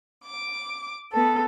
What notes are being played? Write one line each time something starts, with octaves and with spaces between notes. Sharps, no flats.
D6
B3 A4